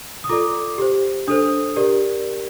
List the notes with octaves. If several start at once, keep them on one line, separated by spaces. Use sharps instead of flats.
D#6
F4 A4 D5 D6
G4 C5
D4 A4 C5 D#6
G4 A#4 D5